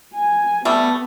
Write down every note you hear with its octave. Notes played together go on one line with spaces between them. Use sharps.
G#5
G3 A3 B3